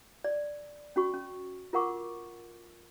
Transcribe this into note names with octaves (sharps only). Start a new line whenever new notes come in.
D5
C#4 F#4 C#6
C#4
F4 A#4 F#5 C#6 D6